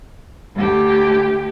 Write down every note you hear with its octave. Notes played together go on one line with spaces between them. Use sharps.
D2 G4